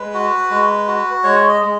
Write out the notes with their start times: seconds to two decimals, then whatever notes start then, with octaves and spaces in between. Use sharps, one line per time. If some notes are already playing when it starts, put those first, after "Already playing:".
Already playing: G#3 B4
0.14 F#4
0.50 G#3
0.88 F#4
1.24 G#3 C#5
1.49 D#5
1.61 G#3